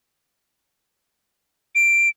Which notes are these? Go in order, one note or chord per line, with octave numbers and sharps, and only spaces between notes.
D7